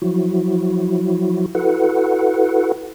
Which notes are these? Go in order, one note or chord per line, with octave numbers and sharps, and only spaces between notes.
F3 F#3 E4 F#4
E4 F#4 A4 B4 F#5